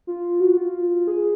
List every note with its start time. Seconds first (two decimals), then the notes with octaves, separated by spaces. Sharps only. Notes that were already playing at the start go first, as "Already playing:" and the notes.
0.07 F4
0.40 F#4
0.58 F4
1.07 G#4